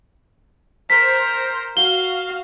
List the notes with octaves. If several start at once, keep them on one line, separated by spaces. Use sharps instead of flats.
A#4 C5 B6
F#4 F5 G7